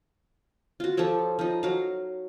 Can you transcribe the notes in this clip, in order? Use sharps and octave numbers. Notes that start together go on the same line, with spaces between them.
F4 F#4
F3 G4 A4 C#5
F3 D#4
F#3 F5